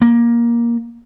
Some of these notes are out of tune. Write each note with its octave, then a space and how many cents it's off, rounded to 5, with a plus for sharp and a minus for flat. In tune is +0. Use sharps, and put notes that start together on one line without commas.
A#3 +15